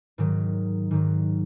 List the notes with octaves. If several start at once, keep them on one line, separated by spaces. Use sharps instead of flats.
G#2 D#3 F#3
G#2 D#3 F#3